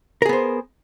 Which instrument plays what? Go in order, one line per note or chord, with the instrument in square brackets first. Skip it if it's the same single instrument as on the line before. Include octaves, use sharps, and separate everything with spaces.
[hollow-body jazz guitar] A#4
G#4
B3
C5